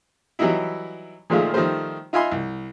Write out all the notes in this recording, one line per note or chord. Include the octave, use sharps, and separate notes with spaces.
E3 F#3 G3 D#4 E4
A#2 D#3 F3 G#3 A3 F4
D#3 F3 G3 A3 C5
D#4 F4 E5 G#5 B5 C6
C2